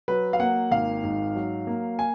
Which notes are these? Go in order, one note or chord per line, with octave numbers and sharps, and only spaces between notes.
F#3 B4
F5
A#3 F#5
G#1 F5
G#2
F#3
A#3
G#5